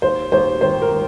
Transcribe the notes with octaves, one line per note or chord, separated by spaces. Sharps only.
D#2 C5
D#2 C5
D#3 C5
A#4
D#3